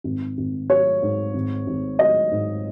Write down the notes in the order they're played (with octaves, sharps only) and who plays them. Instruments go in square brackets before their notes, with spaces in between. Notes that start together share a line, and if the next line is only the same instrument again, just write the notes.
[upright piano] G#1
G#1
F#3 C#5
G#2
G#1
G#1
F#3 D#5
G#2